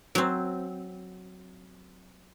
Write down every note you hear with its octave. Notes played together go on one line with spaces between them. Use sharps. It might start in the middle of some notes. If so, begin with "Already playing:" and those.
F#3 C4